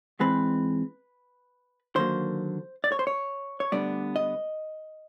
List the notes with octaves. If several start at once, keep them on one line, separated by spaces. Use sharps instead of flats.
G#2 E3 G#3 C4 B4
D#2 D3 F#3 A#3 C5
D5
C#5
C5
C#5
C#5
D2 D3 G3 B3 D5
D#5